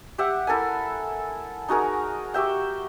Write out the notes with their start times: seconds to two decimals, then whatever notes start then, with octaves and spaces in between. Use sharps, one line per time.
0.18 G4 E5 F#5
0.47 E4 A4 A#4 G#5
1.68 D#4 F#4 G#4 A#4
2.34 F#4 G4 E5 G5